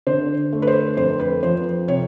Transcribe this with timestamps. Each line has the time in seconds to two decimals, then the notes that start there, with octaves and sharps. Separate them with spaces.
0.07 D3 C5
0.53 A3
0.62 B4
0.67 C5
0.97 F2 C5
1.20 B4
1.43 F3 C5
1.88 C3 C#5